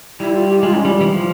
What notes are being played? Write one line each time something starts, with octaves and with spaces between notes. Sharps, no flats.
G3 E4
F4
G4
G#3 F4
C#4
G3 E4
E3
F3